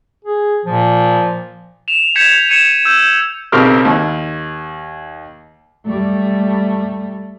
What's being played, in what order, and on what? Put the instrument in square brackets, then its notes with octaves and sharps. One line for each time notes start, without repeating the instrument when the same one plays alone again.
[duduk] G#4
[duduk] A#2 [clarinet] F3
[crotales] E7 F7
G6 G#6 B6 C#7 E7 F7
G#6 C#7 D#7 E7
E6 G6
[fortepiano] B1 C#3 C4 G4 A#4 F6
D#2
[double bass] G3 A3